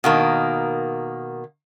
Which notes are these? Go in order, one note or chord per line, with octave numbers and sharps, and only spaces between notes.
B2 D#3 A#3